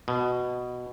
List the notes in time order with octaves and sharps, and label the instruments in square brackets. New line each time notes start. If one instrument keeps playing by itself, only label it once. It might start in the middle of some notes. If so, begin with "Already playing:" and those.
[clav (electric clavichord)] B2